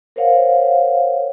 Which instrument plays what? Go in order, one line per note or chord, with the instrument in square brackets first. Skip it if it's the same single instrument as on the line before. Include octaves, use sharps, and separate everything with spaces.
[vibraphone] A#4 C5 C#5 F5 F#5